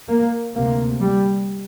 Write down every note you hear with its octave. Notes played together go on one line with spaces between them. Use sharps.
A#3
D2 C3 A#3
G3